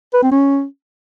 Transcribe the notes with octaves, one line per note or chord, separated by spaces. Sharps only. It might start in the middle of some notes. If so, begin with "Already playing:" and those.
B4
C4
C#4